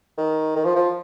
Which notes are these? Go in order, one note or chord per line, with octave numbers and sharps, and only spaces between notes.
D#3
D#3
F3
F3